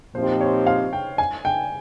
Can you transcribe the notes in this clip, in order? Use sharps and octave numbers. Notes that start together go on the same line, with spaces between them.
A#2 F3 C4 D#4 G4 C5
C#5
F5
G5
G#5
G5